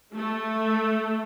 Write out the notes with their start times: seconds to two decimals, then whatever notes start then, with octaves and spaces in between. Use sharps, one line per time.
0.15 A3